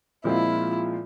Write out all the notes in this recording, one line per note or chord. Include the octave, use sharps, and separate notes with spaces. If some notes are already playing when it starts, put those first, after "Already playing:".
A#2 F3 G#3 C4 E4 F4